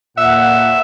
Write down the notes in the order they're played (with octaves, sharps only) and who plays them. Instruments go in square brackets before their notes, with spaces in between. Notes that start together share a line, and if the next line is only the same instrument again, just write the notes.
[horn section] A#2 F#5 [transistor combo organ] E5